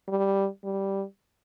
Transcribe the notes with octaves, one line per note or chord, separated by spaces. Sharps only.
G3
G3